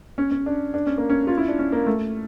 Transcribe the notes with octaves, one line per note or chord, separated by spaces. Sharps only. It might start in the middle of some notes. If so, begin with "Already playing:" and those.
C#4
C#4
D4
D4
C#4
A#3
C#4
F4
E4
D4
C#4
A#3
A3